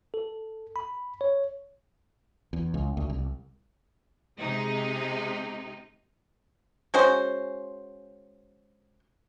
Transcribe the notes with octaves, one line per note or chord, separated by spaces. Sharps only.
A4
B5
C#5
E2
C#2
D2
C2
C3 G#3 D#4
G#3 C#4 F#4 C5